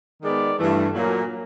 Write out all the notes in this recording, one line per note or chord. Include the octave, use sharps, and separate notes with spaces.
D#3 G#3 B3 D5
G2 E3 A3
A#2 F#3 A#3